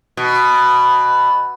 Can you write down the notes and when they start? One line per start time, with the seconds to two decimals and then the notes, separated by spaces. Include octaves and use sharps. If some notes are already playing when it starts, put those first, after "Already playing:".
0.17 B2